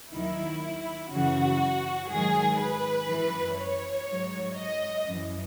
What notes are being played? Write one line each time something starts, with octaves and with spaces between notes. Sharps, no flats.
D#2 D#3 F#3 E4
F#2 C#3 E3 F#4
G#2 D#3 F#3 G#4
B4
F#2 E3
C#5
G#2 F#3
D#5
F#2 E3